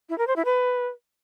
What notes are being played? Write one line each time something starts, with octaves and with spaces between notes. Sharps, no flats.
E4
A#4
C5
E4
B4